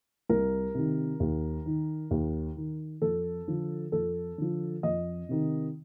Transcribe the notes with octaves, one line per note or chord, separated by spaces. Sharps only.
C2 A#4
C3 D#3
D#2
D#3
D#2
D#3
F2 A4
D3 F3
F2 A4
D3 F3
F2 D#5
C3 D#3